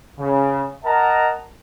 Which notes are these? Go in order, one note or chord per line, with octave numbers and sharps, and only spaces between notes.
C#3
A#4 D#5 F#5 A5 A#5